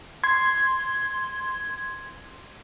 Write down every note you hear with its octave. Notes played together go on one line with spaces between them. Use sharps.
C6 G#6